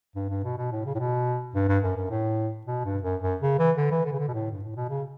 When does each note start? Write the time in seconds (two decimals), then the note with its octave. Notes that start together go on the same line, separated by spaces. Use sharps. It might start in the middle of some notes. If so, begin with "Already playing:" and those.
0.16 G2
0.29 G2
0.44 B2
0.58 B2
0.72 A2
0.86 C#3
0.95 A2
0.99 B2
1.55 G2
1.69 G2
1.84 F#2
1.97 F#2
2.10 A2
2.67 B2
2.85 G2
3.03 F#2
3.22 F#2
3.41 C#3
3.59 E3
3.77 D3
3.91 E3
4.05 D3
4.12 C#3
4.19 D3
4.28 B2
4.33 A2
4.51 G2
4.63 A2
4.76 B2
4.89 C#3